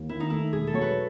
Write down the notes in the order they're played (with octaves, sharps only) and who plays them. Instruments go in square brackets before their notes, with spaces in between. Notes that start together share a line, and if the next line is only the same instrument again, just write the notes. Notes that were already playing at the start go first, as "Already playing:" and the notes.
Already playing: [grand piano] D#2
[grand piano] D#3 [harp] E4
[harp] D#4
[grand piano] A3 [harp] E4
[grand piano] E1 [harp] G#4
[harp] A4
[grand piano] F#3 [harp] C#5
[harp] B4